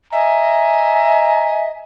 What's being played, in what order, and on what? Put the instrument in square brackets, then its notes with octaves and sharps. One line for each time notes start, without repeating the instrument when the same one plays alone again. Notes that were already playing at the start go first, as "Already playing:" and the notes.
[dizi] D#5 [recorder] E5 [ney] G#5 [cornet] A#5